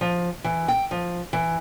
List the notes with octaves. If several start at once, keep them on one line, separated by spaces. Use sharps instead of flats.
F3
E3
G5
F3
E3